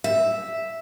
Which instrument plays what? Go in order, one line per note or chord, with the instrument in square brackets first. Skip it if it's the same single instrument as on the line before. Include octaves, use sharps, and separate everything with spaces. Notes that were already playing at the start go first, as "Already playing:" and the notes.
[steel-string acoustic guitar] E5